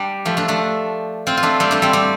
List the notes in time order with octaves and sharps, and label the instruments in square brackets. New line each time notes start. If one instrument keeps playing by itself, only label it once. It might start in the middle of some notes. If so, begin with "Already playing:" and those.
Already playing: [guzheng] G3 D4 G4
F3 A3
A3 D4
A3 D4
C4 F4
F4
A3 D4
G3 C4
A3 D4
G3 C4
G3 C4